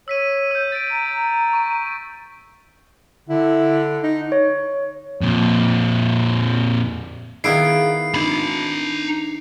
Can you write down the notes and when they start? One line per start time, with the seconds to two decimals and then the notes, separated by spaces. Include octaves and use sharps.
0.08 C#5 E6 B6 D#7
0.51 E6 G6
0.72 A6 D7
0.91 A#5
1.53 C#6
3.29 D3 E4
4.03 D#4
4.32 C#5
5.21 F2 A#2
7.44 D#3 B3 D#4 E4 G#4 F5 C7 D7
8.14 D4 D#4 B5